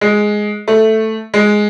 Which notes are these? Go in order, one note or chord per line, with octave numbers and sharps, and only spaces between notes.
G#3
A3
G#3